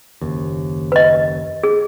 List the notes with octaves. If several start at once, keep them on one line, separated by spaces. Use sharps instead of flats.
F#1 D#2
B4 D#5
G#4